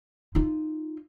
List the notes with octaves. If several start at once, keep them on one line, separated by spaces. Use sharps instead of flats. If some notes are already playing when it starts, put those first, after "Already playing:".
D#4 F4